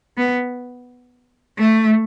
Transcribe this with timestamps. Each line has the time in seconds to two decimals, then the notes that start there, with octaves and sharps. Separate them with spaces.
0.17 B3
1.59 A3